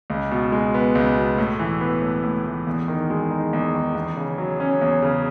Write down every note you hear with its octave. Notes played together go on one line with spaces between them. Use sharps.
C#2
B2
G#3
B3
C#2
B2
A2
E3
B3
A2
A2
E3
E2
D#3
G#3
D#4
E2
D#3
E2
C#3
F#3
C#4
E2
C#3